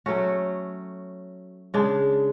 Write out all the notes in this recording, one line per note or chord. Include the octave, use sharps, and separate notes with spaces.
F#3 A3 C#4 F#4
C#3 G#3 D4